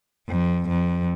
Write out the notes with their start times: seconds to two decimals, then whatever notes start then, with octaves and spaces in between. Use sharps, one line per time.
0.28 F2
0.69 F2